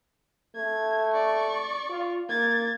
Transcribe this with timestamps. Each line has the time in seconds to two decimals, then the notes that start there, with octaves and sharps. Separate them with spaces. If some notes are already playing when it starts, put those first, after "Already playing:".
0.56 A3 G#6
1.14 D5 C#6
1.90 F4
2.29 A#3 G#6 A6